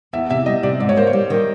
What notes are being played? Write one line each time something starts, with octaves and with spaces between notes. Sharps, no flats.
E2 E5
C3 E5
G3 D#5
C3 D5
G#2 D5
C#5
A#3 C5
C#5
G3
D#3